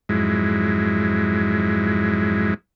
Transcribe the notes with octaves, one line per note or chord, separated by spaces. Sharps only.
F2 G#2 F#3 G#3 E4